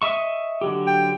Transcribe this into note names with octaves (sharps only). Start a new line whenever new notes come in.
D#5 E5 C#6
D3 F#3 G4
G5